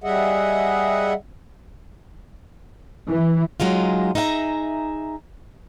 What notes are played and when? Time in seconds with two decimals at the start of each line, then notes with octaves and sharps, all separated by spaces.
0.04 G3 G#4 D#5 E5 F#5
3.11 E3
3.60 F#3 G#3 D#4 F4
4.15 D#4 G#4 E5 F#5 A#5